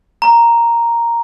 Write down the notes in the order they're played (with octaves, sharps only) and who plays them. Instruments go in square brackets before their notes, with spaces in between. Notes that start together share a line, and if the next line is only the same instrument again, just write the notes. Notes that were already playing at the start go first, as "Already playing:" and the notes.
[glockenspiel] A#5